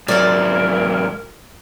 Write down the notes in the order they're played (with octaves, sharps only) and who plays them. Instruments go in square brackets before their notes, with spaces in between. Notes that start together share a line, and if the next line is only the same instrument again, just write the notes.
[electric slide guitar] G#2 F#3 [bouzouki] A#3 D5 [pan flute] A#4